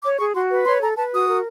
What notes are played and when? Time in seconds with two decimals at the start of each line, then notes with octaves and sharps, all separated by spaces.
0.04 C#5 D6
0.20 G#4 C#6
0.35 F#4 C6
0.51 B4
0.66 C#5 C6
0.82 A4 A#5
0.97 B4 A5
1.13 F#4 D#6
1.28 A#4